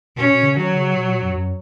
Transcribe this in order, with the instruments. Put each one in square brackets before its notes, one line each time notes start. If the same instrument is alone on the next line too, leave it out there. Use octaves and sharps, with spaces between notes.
[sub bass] B2 [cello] C#4
[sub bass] B2
C#3
[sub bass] D#3 [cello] F#3
[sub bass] C#3
B2
A#2
F#2
F#2